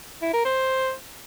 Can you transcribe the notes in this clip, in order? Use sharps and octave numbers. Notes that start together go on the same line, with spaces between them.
E4
A#4
C5